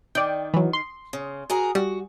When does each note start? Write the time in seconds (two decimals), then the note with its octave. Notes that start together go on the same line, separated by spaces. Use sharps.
0.15 D#3 D5 G5
0.54 E3 F#3
0.73 C6
1.13 C#3
1.50 F#4 G#4 A#4
1.75 G3 F#4